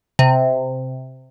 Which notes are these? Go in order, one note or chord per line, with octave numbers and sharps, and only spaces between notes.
C3